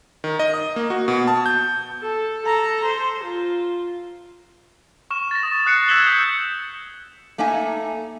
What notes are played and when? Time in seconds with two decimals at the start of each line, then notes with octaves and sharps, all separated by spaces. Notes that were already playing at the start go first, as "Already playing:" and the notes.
0.24 D#3
0.39 D#5
0.54 D#6
0.76 A#3
0.90 F#4
1.08 B2
1.27 A5
1.46 G6
2.02 A4
2.46 A4 A#5
2.85 C5
3.24 F4
5.11 C#6 F6 E7
5.31 A6 A#6
5.43 C#6 D#6
5.66 D#6 F#6 C7 C#7
5.89 E6 G#6 B6 E7 F#7 G7
6.07 D#6 G6 G#6
7.38 A3 A#3 D#4 E5 G#5